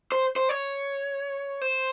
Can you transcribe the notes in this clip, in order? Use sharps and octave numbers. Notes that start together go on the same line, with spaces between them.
C5
C5
C#5
C5